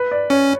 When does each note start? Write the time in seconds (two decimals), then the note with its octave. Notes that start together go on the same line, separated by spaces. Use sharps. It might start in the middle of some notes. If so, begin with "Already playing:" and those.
Already playing: B4
0.11 D5
0.30 C#4 C#5